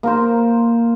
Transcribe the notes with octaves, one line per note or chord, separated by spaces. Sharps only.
A#3 A#4 C5